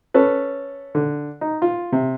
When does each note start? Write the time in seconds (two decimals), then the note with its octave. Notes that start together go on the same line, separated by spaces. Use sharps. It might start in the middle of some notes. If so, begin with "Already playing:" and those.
0.14 C#4 A4 B4
0.95 D3
1.41 D#4
1.62 F4
1.92 C3